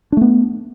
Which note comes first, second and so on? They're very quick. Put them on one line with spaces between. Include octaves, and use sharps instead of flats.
D4 A3 B3